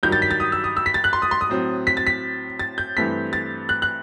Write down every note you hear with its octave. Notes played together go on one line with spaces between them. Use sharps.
G2 D#3 F#3 G6
A6
B6
A6
D#6
E6
D#6
E6
B6
A6
F#6
C6
D#6
C6
D#6
A2 F#3 C4
B6
A6
B6
A6
G6
G2 E3 A3 C4 B6
A6
F#6
F#6